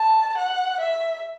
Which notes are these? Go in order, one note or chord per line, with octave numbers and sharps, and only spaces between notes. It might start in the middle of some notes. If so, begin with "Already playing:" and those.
Already playing: A5
F#5
E5